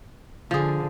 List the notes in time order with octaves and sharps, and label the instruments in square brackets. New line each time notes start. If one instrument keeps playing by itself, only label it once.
[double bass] D3 [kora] F3 G#4